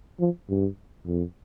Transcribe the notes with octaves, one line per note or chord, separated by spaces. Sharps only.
F3
G2
F2